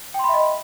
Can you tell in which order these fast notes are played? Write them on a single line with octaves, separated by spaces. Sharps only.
G5 C6 B5 E5 D#5